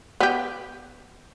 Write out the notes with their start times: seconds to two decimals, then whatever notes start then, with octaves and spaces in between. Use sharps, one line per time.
0.20 B3 G4